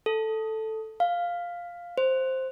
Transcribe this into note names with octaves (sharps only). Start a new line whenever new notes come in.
A4
F5
C5